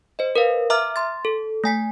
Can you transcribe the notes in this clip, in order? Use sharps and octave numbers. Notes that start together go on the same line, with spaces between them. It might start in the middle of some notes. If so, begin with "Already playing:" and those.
C5 D#5
A#4 B4 F5
E5 A#5 D6 F6
C6 A6
A4
A3 G#5 B6